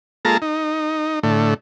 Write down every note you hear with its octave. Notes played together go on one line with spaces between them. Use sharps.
G#3 A#3 F4 A4 A5 A#5
D#4
A2 D3 A3